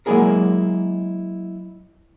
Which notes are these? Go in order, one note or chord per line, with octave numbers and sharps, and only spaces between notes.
F#3 G#3 A#3 E4 G#4 A#4